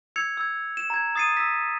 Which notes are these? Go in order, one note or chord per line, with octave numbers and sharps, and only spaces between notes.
E6 G#6 C#7 F7
E6 G#6
E7
A#5 G#6
D#6 A6 C7 C#7 D#7
E6 B6